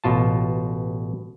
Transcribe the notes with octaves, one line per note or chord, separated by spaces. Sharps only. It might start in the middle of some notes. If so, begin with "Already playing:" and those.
A1 B2 F4 A5